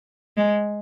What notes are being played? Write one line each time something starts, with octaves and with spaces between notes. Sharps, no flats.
G#3